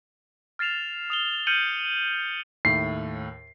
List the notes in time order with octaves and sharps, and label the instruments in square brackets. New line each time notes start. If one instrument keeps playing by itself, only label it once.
[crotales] F6 A6 C7 E7 F7
D#6 F7 G7
F6 G6 C#7 D#7 F#7
[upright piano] D#2 A2 [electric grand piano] C7